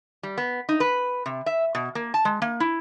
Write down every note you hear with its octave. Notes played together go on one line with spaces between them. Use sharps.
G3
B3
D#4
B4
C3
E5
B2
A#3
A5
G#3
A#3
E4